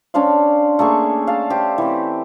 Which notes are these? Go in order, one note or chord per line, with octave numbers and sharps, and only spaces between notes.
C#4 D4 C5 F5
A3 A#3 G#4 C#6
F5 A5
G4 C5
E3 C4